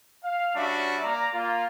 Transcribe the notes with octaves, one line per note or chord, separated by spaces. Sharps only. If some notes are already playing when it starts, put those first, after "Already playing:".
F5
G3 C#4 D4 F#4 E5
A#3 D5 A#5
A#3 F4